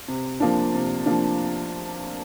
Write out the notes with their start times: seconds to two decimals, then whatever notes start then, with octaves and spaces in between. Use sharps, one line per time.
0.08 C3
0.40 F3 A#3 D4
0.74 C3
1.06 F3 A#3 D4